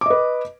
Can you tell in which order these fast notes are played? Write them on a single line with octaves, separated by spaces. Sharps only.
D6 D#5 B4